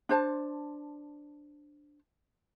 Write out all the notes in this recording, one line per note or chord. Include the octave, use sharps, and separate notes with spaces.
D4 C5 A5